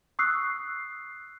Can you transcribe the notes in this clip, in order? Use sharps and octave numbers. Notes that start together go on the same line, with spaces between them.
C#6 D#6 E6 F#6 C7